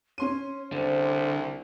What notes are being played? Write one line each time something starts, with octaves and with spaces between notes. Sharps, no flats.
C#4 C#5 C6 D#7
C2 D3 C5